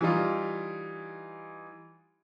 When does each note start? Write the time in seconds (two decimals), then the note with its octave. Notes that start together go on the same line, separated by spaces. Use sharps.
0.01 E3 G3 D#4 F4